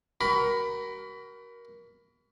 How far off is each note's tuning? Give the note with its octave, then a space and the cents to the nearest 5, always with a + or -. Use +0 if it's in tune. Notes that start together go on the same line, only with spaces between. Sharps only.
F#4 +35 A#4 +20 B5 +15